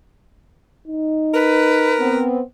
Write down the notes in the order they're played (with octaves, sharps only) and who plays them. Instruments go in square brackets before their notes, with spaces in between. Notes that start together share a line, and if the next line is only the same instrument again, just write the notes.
[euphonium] D#4
[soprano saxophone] A#4 [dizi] B4
[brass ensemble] B3 C4